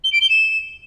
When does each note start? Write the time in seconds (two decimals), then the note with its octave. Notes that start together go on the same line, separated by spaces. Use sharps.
0.04 G7
0.13 D7
0.21 G7
0.30 E7